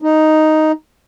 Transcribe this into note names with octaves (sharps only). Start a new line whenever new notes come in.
D#4